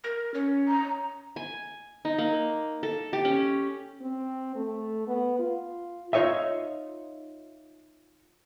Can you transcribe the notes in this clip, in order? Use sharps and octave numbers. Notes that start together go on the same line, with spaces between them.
A#4
C#4
A#5
G#5
D#4
A#3
A4
G4
C#4
C4
A3
B3
F4
D#4 F4 G4 C#5 D#5 E5